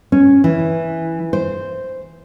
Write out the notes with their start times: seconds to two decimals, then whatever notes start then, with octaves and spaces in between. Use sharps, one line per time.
0.12 C#4
0.44 E3
1.33 C5